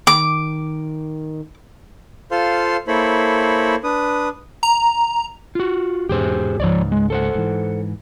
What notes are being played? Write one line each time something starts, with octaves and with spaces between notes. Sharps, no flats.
D#3 D6
F4 A4 C5 F5 C6
A#3 E4 A4 C5 C#5 B5
D4 B4 D#6
A#5
F4 F#4
E2 G#2 B2 G4 G#4 C5
C#2 G#2 F3 C#5 D5
G#3
A4 C5 F#5
G#2 E3